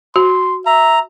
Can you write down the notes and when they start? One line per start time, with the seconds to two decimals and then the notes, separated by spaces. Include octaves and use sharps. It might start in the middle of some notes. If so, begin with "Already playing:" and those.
0.16 F#4 C6
0.66 E5 A#5